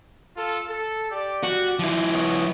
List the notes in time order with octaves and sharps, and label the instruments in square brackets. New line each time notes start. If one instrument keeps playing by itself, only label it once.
[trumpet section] F4 A4
A4
G4 D5
[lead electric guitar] F#4
F3 E4
[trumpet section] B3 C#5 D#5